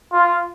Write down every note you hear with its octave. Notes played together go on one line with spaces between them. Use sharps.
F4